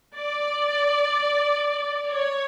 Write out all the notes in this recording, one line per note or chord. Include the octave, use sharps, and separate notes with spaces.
D5
C#5